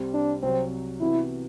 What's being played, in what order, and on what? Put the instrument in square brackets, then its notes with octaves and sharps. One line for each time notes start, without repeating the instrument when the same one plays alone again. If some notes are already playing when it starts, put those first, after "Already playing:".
Already playing: [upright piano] C2 C3 G3 C4
[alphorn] D4
[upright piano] C2 C3 F#3 [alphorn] C4
[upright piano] C3 E3 B3 F#4 [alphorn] E4